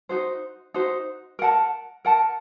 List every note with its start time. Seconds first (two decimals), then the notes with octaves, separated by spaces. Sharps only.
0.09 D#4 F#4 C5
0.74 D#4 F#4 C5
1.39 A#4 F#5 A5
2.05 A#4 F#5 A5